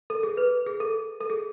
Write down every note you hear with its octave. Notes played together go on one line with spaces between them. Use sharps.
A4
G#4
B4
G#4
A4
A4
G#4